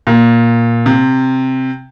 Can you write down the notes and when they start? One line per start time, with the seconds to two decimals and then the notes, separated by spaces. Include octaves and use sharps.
0.07 A#2
0.86 C3